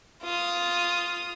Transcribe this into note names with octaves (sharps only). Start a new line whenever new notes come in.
F4 D#6